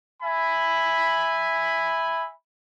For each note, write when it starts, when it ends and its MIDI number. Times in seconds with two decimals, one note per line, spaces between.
0.22 2.27 76
0.22 2.27 80
0.22 2.27 83